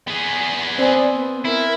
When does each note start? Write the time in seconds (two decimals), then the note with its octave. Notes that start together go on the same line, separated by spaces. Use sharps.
0.08 B3 G#4
0.78 C4 D5 G#5
1.14 B3
1.45 E4 A#4